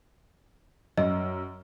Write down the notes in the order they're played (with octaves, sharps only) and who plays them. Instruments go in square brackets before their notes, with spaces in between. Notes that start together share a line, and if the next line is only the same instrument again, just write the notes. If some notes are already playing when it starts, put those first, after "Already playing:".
[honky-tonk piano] F#2 [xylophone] D#5